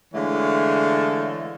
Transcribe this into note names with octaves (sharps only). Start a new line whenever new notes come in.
D3 E3 G#3 A3 C#5 F5